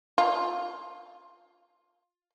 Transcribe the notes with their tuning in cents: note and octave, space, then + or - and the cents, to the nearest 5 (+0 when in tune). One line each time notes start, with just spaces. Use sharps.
F4 +20